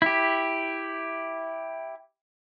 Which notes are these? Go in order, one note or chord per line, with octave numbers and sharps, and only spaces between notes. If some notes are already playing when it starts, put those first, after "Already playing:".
E4 G4